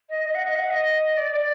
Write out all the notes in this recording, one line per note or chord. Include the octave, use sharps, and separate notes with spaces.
D#5
D#5
F#5
D#5
F#5
D#5
D5
D5